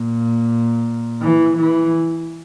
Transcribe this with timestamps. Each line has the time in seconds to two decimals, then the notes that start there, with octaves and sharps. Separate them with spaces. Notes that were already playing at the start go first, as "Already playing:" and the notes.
Already playing: A#2
1.22 E3
1.58 E3